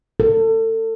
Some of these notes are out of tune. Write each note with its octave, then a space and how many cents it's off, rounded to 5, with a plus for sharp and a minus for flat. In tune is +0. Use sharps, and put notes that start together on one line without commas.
A4 +30